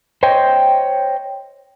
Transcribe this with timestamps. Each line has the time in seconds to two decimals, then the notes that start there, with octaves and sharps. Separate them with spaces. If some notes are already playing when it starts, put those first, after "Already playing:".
0.23 C5 C#5 D#5 G5